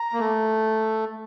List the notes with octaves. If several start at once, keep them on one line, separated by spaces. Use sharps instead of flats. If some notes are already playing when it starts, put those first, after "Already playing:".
Already playing: A#5
A#3
A3